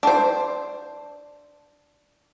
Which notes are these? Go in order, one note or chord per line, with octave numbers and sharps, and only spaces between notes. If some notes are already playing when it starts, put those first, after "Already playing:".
D4 C5